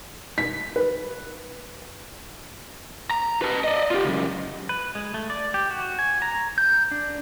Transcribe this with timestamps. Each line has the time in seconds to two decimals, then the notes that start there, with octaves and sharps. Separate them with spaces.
0.38 B6
0.76 B4
3.11 A#5
3.42 B4 A5
3.64 D5 D#5
3.91 F4 G4
4.05 C#2 F#2
4.69 B4
4.95 G#3
5.14 A3
5.30 D5
5.54 G4
5.71 F#4
5.99 G#5
6.22 A#5
6.58 G6
6.91 D4